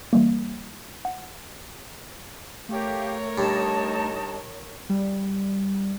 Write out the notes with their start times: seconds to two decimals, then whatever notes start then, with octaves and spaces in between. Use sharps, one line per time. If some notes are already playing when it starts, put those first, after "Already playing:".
0.13 E3 G3 A#3
1.05 F#5
2.69 A3 G4 A#4 C#5 F5
3.38 G2 D#4 A5
4.89 G3